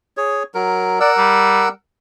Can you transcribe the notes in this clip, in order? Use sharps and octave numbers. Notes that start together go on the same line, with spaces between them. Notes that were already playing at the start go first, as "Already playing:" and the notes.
G#4 C#5
F#3 A#4
A#4 D5 F#5 E6
G3